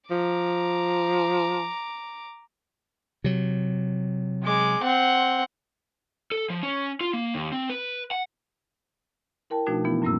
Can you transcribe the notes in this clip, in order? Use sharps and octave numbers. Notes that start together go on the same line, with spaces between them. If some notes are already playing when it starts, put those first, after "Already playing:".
F3 A#5 D6
C3 F#3
G#3 D6
C4 F#5
A4
F3
C#4
F4
A#3
D#2
C4
B4
F#5
E4 A#4 G5 A5
B2 F3 A3 D4 D#4 F#4
E3 F3 B3 E4
F#2 A2 G3 A#3 C#4 E6